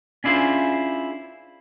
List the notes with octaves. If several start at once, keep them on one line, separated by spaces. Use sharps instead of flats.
C#4 D4 E4 F4 G#4 C5